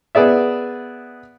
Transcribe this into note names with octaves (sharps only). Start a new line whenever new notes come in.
B3 G#4 D5 E5